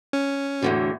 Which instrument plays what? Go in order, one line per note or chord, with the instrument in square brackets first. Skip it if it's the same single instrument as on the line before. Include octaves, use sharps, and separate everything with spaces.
[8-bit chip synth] C#4
[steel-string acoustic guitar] E2 A2 D3 [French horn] F#4